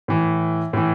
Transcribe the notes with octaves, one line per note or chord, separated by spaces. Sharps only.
A2 E3
A2 E3